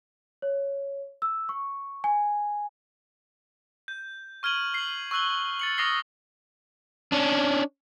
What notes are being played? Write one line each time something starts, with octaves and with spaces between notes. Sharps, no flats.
C#5
E6
C#6
G#5
G6
C#6 F6 G#6 D#7 F#7
C7 F#7
C#6 E6 F#6 F#7 G7
A6 C#7 F#7
C#6 D#6 F6 A#6 C7 G7
C#4 D4